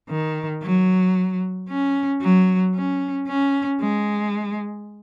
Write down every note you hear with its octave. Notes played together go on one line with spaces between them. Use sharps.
D#3
F#3
C#4
F#3
C#4
C#4
G#3